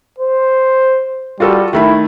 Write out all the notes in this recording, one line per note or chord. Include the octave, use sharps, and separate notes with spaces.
C5
G3 F4 F#4 A4
D#3 A3 E4 B5